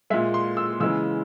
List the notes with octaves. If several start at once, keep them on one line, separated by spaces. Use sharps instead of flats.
A#2 G#3 E5
C6
E6
C#3 E3 G#3 E6